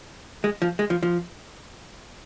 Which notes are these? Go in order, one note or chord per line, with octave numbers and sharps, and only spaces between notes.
G#3
F3
G#3
F3
F3